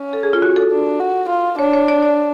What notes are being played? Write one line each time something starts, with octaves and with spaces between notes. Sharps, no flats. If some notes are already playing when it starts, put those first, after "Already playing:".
Already playing: C#4
A4
G#4
F4
F#4
A4
D4
F#4
F4
D4 C#5
C#5
D5
D5